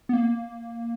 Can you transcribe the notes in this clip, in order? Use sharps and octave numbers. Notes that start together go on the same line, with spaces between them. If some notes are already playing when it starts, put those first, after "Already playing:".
B3
A#3